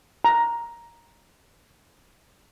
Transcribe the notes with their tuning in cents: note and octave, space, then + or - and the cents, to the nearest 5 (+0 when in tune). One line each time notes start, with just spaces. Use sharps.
A#5 +5